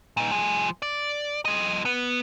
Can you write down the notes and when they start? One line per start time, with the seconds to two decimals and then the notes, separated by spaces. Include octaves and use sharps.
0.17 A#2 D#4
0.31 F3 G#4
0.82 D5
1.45 F3 D#5
1.85 B3